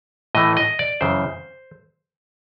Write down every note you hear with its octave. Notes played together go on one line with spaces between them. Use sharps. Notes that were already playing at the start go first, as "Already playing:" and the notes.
A2 E3 A3 D#5
D#5
D5
F#2 C#3 E3 C5